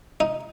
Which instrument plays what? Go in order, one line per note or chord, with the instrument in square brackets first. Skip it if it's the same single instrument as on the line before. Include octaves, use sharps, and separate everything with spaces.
[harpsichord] D#4